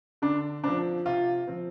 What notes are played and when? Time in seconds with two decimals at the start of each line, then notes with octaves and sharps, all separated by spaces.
0.22 D3 D4
0.64 F3 C4 D4
1.06 C3 F4
1.47 F3 C4